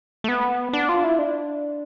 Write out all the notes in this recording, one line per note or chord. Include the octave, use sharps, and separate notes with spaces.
A3
B3
D4
F4
E4
D4